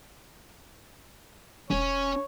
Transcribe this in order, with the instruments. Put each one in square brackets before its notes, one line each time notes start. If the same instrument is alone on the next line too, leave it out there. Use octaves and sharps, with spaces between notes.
[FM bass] E1 [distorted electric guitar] C#4 [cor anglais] C#5